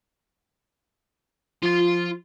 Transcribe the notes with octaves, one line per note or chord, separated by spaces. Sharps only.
F3 F4 C6